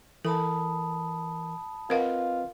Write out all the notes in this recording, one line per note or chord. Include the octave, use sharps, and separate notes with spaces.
E3 A4 A#4 A5 B5 D#6
C4 F4 A#4 B4 D#5 F5 F#5